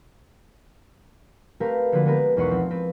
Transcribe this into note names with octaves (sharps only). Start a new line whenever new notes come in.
A3 C4 G4 A#4 B4 F5
D3 F3 A#3 F#4 A4 B4
G#3 B3 G4 A#4 B4
B1 E2 B4 F#5 C6 C#6
F3 C4
C4 B4